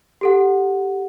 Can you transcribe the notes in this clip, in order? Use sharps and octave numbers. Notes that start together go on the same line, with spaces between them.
G4 A4 F#5